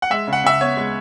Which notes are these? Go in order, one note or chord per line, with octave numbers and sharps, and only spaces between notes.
F#5
G#3 E5
C#3
F#5
C#3 E5
B3 C#5
G#3